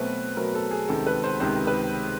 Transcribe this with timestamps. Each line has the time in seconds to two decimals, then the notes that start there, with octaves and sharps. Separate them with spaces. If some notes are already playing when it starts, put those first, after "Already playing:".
Already playing: B2 F#3 A3 C4 B4
0.36 B2 F#3 A3 C4 A#4
0.55 A4
0.71 G#4
0.88 C#2 C3 D#3 A4
1.07 B4
1.24 C5
1.40 C#2 C3 D#3 C5
1.67 B4